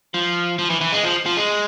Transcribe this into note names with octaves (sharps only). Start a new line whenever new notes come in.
F3
F3
E3
E3
G#3
F3
F3
G#3